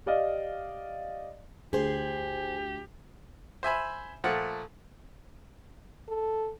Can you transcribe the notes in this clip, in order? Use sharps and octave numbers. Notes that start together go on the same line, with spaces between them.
G4 D5 D#5 F5
D2 G4 G#4 C5
C5 E5 G#5 B5
A#2 F3 A3 F#5
A4